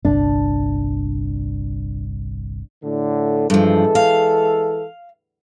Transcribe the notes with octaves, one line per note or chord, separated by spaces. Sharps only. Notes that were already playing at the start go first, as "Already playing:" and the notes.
G1 C2 D4
A2 D3
G2 E3 F3 G#3 A4
F5